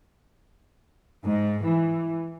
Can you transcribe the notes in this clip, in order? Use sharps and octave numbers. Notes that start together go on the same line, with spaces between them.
G#2
E3